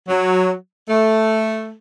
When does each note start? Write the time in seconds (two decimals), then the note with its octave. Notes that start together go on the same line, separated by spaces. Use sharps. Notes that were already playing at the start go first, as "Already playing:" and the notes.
0.09 F#3
0.89 A3